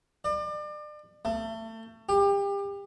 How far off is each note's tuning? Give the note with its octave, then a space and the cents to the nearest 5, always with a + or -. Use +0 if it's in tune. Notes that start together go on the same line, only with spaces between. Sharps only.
D5 +35
A3 +30
G4 +30